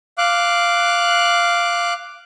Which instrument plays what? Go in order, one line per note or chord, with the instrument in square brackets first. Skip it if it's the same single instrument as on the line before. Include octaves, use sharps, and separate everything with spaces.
[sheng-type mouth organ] F5 D6 F#6